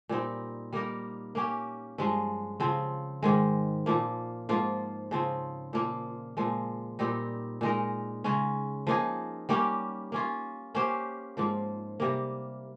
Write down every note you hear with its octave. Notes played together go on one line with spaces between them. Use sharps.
A#2 G3 C4 D#4
G3 A#3 D#4 A#4
A#3 C#4 G4
G2 F3 G#3
C#3 F3 C4
G#2 D#3 G#3
A#2 F3 A#3
G#2 F3 A#3 F4
C#3 F3 C4
A#2 F3 A#3
A#2 F3 G#3
A#2 G3 C4 D#4
A#2 G#3 D#4 A#4
C#3 G#3 C#4
F3 A#3 D#4 G#4
G3 A#3 C#4 G4
A#3 C#4 F4
A#3 C#4 G4 C5
G#2 F3 A#3
C3 G3 A#3